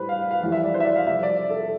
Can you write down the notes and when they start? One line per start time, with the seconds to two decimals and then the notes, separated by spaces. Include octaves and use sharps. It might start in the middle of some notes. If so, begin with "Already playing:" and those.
Already playing: A2 G3 B4 C5
0.09 F5
0.19 F5
0.31 F5
0.41 F2 E3 G3 F5
0.52 E5
0.64 D5
0.74 C5
0.80 E5
0.85 D5
0.96 F5
1.07 F2 C3 G3 E5
1.23 D5
1.50 A4
1.61 A4